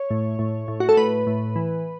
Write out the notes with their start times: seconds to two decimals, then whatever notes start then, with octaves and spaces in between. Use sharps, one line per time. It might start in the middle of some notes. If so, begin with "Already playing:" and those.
Already playing: C#5
0.10 A2
0.39 A2
0.68 A2
0.80 F#4
0.89 A4
0.97 A2 B4
1.27 A2
1.56 E3